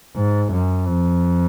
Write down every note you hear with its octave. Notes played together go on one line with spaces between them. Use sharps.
G#2
F#2
F2